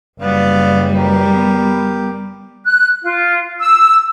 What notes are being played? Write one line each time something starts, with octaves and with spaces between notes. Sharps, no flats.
F#1 G3 B3 D5 F5
G4 A#4 B4
B3
F#6
F4
E6